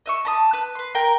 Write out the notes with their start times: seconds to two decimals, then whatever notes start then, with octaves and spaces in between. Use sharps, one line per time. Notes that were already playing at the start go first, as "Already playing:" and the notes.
0.06 D#5 E5 C#6
0.25 A5 A#5 D#6
0.53 B4
0.75 B4 C6
0.95 A#4 G5 A#5